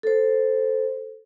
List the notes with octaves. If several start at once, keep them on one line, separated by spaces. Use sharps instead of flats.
A4 C5